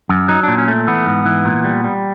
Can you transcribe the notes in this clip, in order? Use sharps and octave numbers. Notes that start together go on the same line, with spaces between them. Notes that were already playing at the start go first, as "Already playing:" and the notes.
F#2
F#3 D#4
A#2 D4
C#4
A3
E3 B3
G#2
E3
A#2
G3
G3